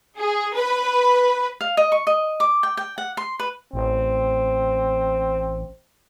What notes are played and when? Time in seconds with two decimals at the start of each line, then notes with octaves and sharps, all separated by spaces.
0.18 G#4
0.55 B4
1.61 F5
1.77 D#5
1.92 C#6
2.07 D#5
2.40 D6
2.63 G5
2.77 G5
2.98 F#5
3.17 C6
3.39 B4
3.73 A1 C4